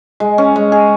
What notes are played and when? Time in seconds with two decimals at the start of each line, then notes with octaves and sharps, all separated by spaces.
0.20 G#3
0.38 C#4
0.56 G#3
0.72 G#4